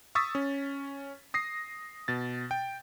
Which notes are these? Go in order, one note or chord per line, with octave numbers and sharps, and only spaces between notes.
C#6 D#6 E6 A6 B6
C#4
D#6 A#6 C7
B2 A6
G5